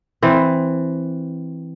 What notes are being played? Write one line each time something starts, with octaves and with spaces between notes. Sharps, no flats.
E3 C4